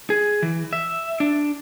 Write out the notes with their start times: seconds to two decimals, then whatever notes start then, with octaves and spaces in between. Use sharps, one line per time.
0.10 G#4
0.43 E3
0.73 E5
1.20 D4